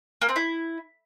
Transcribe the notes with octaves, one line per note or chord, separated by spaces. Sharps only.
A#3
C4
E4